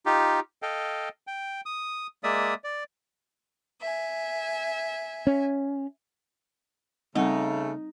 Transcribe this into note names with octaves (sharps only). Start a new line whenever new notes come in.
D#4 F4 G4
A4 D#5 F5 G5
G5
D#6
G#3 A#3 D5 E5 D#6
D5
E5 G#5
C#4
C#3 G3 A3 C4 D#4 F#5